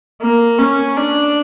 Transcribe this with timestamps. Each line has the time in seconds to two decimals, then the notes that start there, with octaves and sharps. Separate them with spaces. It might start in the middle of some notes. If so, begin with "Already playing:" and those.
0.21 A#3
0.59 C#4
0.97 D4